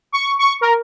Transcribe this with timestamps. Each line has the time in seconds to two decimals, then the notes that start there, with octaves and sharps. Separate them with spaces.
0.12 C#6
0.39 C#6
0.61 A#4